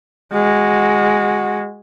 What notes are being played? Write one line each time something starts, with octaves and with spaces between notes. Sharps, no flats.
G#3 F#4